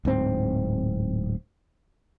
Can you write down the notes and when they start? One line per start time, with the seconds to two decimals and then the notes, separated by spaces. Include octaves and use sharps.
0.05 D1 G#2 C4